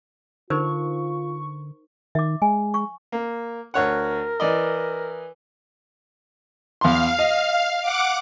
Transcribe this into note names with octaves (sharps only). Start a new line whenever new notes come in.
D3 D#4 F4 A#4 C5 C#6
D#3 E5 D6
G#3 G#5
C#6
A#3
D2 A#4 C#5 F#5
E3 D5 D#5
E2 F5 C6
D#5
F#5 D6